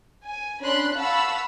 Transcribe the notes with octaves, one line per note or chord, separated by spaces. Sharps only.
G#5
C#4 D4 B5 C6 F#6
F5 F#5 A5 B5 C#6 E6